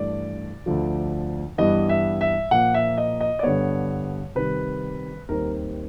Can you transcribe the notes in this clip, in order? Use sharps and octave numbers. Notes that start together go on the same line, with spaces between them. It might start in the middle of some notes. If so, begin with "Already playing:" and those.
Already playing: G2 E3 A3 D5
D2 D3 F3
G2 E3 G3 B3 D#5
E5
E5
A#2 F3 A#3 F#5
E5
D#5
D#5
D5
G2 D3 G3 B3 C#5
C3 D#3 G3 B4
D#2 D#3 G3 C4 A#4